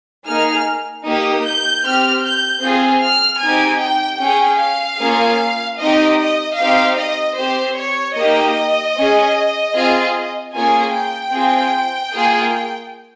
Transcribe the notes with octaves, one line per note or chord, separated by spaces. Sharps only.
A#3 D#4 G#4 F6
A#3 D#4 G4 D#6
G6
C4 G4 F6
G6
C4 F4 G#4
F6
C4 D#4 G4 G#5
G5
C#4 G#4 G5
F5
A#3 C#4 F4 G#4
C4 D#4 G4 D#5
D#5
C4 D#4 G4 F5
D#5
C4 G4 C5
C#5
A#3 D#4 G4 D#5
C#4 G#4
C4 F4 G#4
A#3 C#4 F4 G#4 G#5
G5
C4 F4 G#4
A#3 F4 G#4